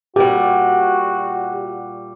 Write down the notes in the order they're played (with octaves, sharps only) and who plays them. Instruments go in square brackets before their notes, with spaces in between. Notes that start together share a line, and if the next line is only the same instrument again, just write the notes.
[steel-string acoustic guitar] A#2 G3 [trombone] F#4 [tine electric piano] G4